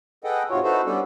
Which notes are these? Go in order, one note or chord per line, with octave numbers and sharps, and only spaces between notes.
G#4 A4 B4 D#5 F#5 G5
G#2 C3 F4 F#4 C#5
D#4 E4 F#4 A4 B4 C5
G3 B3 C#4 D4 A4